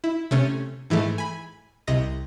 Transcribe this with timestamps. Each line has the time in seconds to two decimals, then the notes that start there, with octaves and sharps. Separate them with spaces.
0.04 E4
0.31 C3 A3 C#4 A6
0.90 G#2 E3 G#3 A3
1.18 G#5 B5
1.87 C2 C3 D#5 A#6